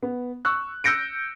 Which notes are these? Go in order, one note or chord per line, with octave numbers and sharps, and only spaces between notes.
B3
C#6 E6 F#6
E6 F#6 G6 A#6 C#7 D7